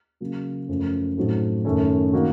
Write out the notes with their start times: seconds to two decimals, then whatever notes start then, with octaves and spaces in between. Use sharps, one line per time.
0.20 C#3 F#3 A#3
0.68 F#2 F3 A3 C#4
1.17 A2 F#3 A3 C4 D#4
1.65 F#2 D#3 A3 C#4
2.13 D#3 A#3 D#4 F#4